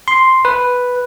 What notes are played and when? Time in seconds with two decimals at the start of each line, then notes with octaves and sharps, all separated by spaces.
0.08 C6
0.45 B4